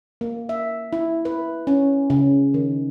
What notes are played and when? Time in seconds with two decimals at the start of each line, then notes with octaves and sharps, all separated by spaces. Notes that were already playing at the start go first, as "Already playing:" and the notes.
0.21 A#3
0.49 E5
0.93 E4
1.25 B4
1.67 C#4
2.10 C#3
2.54 D#3